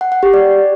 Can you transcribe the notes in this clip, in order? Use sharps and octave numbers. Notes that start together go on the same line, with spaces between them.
F#5
F#5
G4
D5